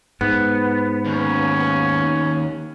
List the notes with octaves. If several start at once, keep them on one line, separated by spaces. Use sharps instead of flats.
G#2 B3
D#2 C#4